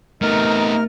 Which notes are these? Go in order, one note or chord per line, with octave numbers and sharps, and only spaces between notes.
C3 A3 B3 D#4 A#4 F6